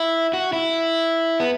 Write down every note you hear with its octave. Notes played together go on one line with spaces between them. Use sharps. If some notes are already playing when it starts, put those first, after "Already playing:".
Already playing: E4
F#4
E4
B3